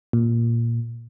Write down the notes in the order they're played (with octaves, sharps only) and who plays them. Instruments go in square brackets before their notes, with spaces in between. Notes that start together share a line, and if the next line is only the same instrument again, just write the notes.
[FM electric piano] A#2